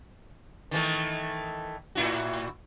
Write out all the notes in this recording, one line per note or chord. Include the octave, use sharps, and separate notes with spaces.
D#3 E3 A3
A2 E4 F#4